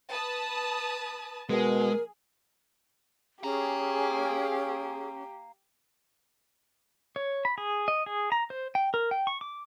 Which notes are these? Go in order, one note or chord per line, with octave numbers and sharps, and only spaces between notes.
B4 A5 D#6
B2 G#3 G#4 A#4
C#4 G4 G#4 F5 A#5
C#5
B5
G#4
D#5
G#4
A#5
C5
G5
A#4
G5
C#6
D6